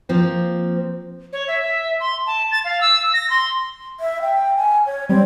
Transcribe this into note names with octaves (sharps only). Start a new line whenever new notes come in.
F3 A#3 C4
C#5
E5
E5
C6
A5
A6
F5
E6
A#6
C6
E5
G5
G#5
C#5
G3 C4